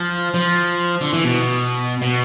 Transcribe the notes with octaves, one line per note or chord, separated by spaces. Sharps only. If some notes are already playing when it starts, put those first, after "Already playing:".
Already playing: F3
F3
D3
E3
B2
B2